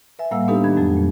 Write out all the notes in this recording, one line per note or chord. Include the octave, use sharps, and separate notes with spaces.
B4 E5 G#5
A2 G3 A#3 F5 F#5 E6
B3 D4 D#4 G4 A4 B4
D#3 D4 B5 G#6
F2 F#3 A3
A#2